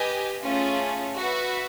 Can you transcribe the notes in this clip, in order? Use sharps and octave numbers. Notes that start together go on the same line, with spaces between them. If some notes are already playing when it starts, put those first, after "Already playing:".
Already playing: G4 B4 D#5 G#5
A3 C#4 F4 G#4
F#4 B4 E5